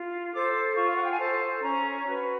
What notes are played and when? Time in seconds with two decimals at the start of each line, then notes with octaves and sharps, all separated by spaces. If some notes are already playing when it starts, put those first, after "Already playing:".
Already playing: F4
0.33 A4 C5 D6
0.75 F4 C#6
0.87 F5
0.95 F#5
1.03 G5
1.11 G#5
1.19 A4 C5 A5
1.62 C#4 A#5
2.05 F#4 B4